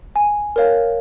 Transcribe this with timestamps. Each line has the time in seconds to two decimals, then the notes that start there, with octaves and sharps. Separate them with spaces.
0.16 G#5
0.56 A#4 C#5 F5